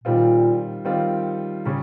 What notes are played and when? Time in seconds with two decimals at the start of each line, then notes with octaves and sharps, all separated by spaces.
0.04 A#2 D#3 G3 C4 F4
0.85 D#3 G3 C4 F4
1.66 C#3 G3 C#4